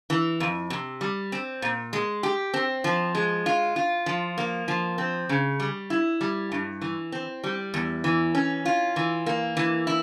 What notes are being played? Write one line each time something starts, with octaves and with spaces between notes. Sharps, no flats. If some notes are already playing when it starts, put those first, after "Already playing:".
E3
F2
C3
G3
C4
A#2
G#3
G4
C4
F3
G#3
F4
F4
F3
A#3
F3
C4
C#3
G3
E4
G3
G2
E3
C4
G3
E2
E3
C#4
F4
E3
A#3
E3
E4